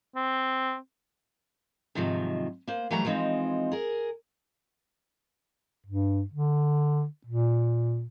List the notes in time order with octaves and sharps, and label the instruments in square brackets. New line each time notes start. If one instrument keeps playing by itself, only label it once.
[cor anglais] C4
[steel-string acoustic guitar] G#2 C3 D#3 F3 F#3
A#3 C5
E3 F#3 G3 A3 F#5 A#5
E3 F3 G#3 C4 D#4
G#4 A#4
[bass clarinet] G2
D3
A#2